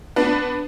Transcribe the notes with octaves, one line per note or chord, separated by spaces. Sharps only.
B3 D4